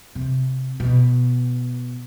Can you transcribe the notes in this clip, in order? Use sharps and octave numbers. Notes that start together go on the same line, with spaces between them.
C3
B2